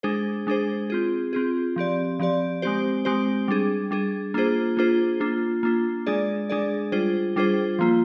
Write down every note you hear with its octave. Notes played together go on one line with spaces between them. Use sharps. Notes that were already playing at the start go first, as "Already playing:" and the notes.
G#3 D4 G#4 C5
G#3 D4 G#4 C5
C4 F4 G#4
C4 F4 G#4
F3 C4 G4 D5
F3 C4 G4 D5
G#3 C4 G4 C5
G#3 C4 G4 C5
G3 D4 G#4
G3 D4 G#4
A#3 D4 F4 G#4 C5
A#3 D4 F4 G#4 C5
A#3 D4 F4
A#3 D4 F4
G#3 D4 G#4 D5
G#3 D4 G#4 D5
G3 D4 F4 G#4 C5
G3 D4 F4 G#4 C5
F3 A#3 F4